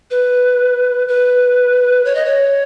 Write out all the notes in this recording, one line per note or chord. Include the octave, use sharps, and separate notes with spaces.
B4
B4
C#5
D#5
C#5